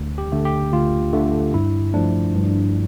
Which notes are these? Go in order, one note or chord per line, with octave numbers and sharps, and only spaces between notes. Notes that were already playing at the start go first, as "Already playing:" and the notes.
Already playing: D2
G4
D3 A3
G4
D2 F4
D3 A3
G2 E4
F3 A3 D4
G2